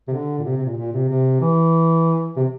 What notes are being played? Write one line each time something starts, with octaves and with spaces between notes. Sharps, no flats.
C3
D3
A#2
C3
C3
A#2
A#2
C3
C3
E3
C3